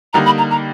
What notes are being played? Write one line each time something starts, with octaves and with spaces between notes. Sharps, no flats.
D3 G3 A#3 D#4 A#5
B5
A#5
A#5